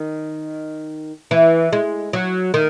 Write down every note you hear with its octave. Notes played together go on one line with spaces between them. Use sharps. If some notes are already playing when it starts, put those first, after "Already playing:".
Already playing: D#3
E3
G#3
F#3
D#3